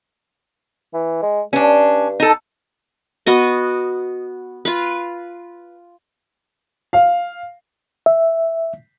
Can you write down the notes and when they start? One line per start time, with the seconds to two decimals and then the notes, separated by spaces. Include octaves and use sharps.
0.94 E3
1.22 G#3
1.53 G2 C#4 D4
2.20 D#4 A4
3.26 B3 F#4 D#5
4.65 F4 B4
6.93 F5
8.06 E5